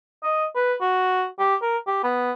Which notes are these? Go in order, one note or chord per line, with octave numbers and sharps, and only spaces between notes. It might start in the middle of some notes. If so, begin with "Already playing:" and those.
D#5
B4
F#4
G4
A#4
G4
B3